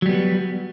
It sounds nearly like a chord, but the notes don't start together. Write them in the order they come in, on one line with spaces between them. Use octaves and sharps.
F#3 G3 B3